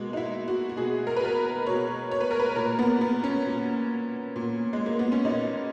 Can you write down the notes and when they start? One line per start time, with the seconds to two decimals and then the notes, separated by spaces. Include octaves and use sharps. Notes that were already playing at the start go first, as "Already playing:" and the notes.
Already playing: B2 G#3 A#3
0.13 D#4
0.17 E4
0.48 F#4
0.69 F#4
0.77 B2 G#4
1.07 A#4
1.17 B4
1.25 A#4
1.67 B2 C#5
2.11 C#5
2.21 B4
2.31 A#4
2.40 B4
2.56 A#2 A#4
2.79 B3
3.01 B3
3.24 C#4
3.46 A#2
4.36 A#2
4.73 G#3
4.86 A#3
4.99 B3
5.12 C#4
5.25 A#2 D#4